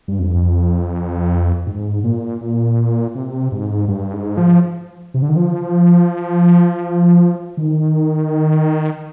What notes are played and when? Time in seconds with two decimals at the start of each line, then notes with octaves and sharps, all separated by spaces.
0.08 G2
0.19 F2
1.66 G#2
2.04 A#2
2.41 A#2
3.15 C3
3.52 G#2
3.88 G2
4.13 G#2
4.37 F3
5.14 C3
5.22 D3
5.29 D#3
5.36 F3
7.57 D#3